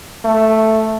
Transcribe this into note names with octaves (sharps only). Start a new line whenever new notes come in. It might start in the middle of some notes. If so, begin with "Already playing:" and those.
A3